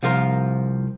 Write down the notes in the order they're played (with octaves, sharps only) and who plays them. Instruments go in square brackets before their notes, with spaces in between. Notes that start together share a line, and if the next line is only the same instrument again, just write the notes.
[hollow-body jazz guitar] C2 F3 F4 A#4